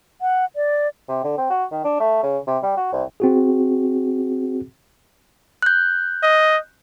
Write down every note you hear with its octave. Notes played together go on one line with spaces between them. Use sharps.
F#5
D5
C3
D3
C4
F#4
D#3
D4
A3
C#3
C3
G3
F#4
C2
C4 F#4 G#4
F#6 G6
D#5